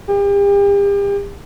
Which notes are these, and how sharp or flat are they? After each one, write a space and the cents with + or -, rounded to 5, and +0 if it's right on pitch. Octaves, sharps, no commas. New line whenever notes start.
G4 +40